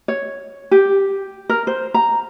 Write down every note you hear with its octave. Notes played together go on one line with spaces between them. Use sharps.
C#5
G4
A#4
C5
A#5